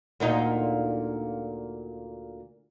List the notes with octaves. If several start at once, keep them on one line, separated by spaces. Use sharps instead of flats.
D2 A#2 D#4